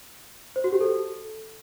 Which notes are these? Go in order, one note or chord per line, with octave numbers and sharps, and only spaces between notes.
C5
F#4
G4
A4